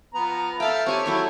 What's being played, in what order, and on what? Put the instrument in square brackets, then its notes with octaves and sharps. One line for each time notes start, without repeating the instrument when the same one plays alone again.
[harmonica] F3 B3 A#5
[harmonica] A4 E5 F5 [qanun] G5 A5
[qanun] C4 G4 G#5 [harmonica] C#5
[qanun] F#3 A4 E5 [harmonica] E4